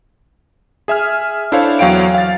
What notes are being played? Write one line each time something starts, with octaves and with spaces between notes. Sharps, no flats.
G#4 E5 G#5 F6
D4 E4 A4 C5 C#5 F5
E2 F#3 C#5 F5 G5 D7
F5 A6